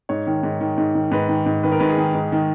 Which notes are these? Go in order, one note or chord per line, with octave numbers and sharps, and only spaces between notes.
G#2 C#5
D#3
G#2
D#3
G#2
D#3
G#2 B4
D#3
G#2
D#3 B4
A#4
G#2 B4
G#4
D#3
G#2
D#3